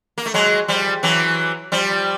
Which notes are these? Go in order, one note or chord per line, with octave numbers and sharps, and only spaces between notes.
A#3
A3
F#3 G#3
F3 G3
E3 F#3
F3 G3